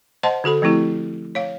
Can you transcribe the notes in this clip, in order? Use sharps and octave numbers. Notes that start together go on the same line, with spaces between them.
C5 D#5 F#5 A5 C6
D3 F#4 A4 B5
F3 A3 C4 E4 G4
C#5 F5